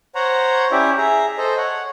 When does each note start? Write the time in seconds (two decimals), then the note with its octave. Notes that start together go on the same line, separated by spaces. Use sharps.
0.15 C5 C#5 F#5 A#5
0.71 C#4 E4 G4 D5 E5
0.98 G#4 E5 A#5
1.38 A4 C5 D#5
1.57 C#5 F#5